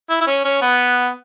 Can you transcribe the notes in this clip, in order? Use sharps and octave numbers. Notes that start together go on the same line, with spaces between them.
E4
E4
C#4
C#4
B3